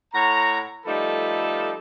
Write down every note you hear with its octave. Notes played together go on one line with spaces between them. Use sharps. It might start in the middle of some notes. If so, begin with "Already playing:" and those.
A2 C#5 F#5 A#5
F3 G3 A3 D#4 A4 B4